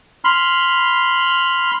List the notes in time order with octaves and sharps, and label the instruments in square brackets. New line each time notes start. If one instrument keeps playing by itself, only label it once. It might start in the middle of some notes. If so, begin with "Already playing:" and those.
[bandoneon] B5 C6 F6